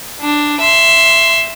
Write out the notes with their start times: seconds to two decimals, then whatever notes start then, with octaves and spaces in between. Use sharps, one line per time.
0.21 D4
0.61 E5 C6